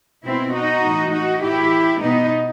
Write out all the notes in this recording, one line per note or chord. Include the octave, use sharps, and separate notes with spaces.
B2 C4 E4
D#4 F#4
A2 E3
D#4 F#4
A2 E3 E4 G4
B2 B3 D#4